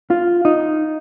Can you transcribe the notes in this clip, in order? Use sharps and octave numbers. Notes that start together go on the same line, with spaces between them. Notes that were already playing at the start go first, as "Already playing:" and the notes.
F4
D#4